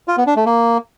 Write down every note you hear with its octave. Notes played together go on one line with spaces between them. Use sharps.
F4
B3
D4
A3
A#3